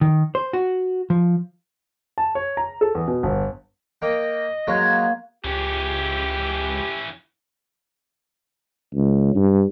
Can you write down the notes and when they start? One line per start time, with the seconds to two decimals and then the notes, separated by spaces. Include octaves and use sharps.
0.01 D#3
0.35 C5
0.53 F#4
1.10 F3
2.18 A5
2.35 C#5
2.57 A#5
2.81 A4
2.95 E2
3.08 B2
3.23 G1
4.02 A#3 D#5 G5
4.67 F#3 G#3 A#3 C#4 F#6 G#6
5.45 C#2 E3 C#4 G4
8.95 C#2
9.35 G2